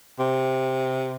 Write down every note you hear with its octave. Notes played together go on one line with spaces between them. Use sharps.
C3